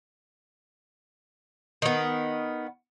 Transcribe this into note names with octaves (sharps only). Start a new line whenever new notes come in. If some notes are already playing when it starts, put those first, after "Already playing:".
D#3 B3